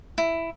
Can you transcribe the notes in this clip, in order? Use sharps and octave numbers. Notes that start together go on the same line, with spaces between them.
E4